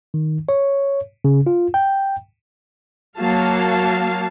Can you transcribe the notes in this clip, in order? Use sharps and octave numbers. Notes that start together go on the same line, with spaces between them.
D#3
C#5
C#3
F4
G5
F#3 A#3 F5 A5